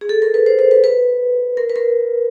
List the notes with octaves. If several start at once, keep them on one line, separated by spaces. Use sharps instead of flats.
G#4
A4
A#4
B4
C5
C5
B4
B4
A#4
B4
A#4